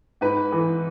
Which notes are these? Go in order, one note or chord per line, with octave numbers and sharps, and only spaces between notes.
G#2 B4
E3